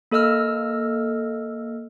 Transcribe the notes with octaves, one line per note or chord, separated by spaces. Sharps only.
A#3 A4 D#5 E6 F6